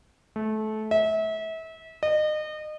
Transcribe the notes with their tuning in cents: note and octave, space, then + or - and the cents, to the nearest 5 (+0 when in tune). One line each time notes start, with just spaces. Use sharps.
A3 -25
E5 -30
D#5 -30